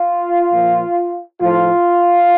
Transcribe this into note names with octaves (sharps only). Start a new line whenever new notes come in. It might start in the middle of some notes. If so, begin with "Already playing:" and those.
Already playing: F4
A#2 F3
A2 F3 F4